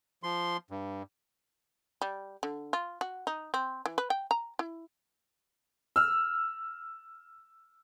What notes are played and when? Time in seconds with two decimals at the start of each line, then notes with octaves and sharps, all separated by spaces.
0.23 F3 C6
0.71 G2
2.02 G3
2.43 D3
2.73 F4
3.01 F#4
3.27 D#4
3.54 C4
3.86 E3
3.98 B4
4.10 G5
4.31 A#5
4.59 E4
5.96 E6 F6